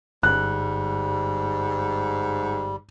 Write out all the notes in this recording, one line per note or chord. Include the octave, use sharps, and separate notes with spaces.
G1 G#2 G3 F#6